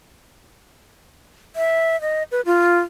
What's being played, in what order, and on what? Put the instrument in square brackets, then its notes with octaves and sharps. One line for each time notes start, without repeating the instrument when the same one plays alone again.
[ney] E5
D#5
B4
F4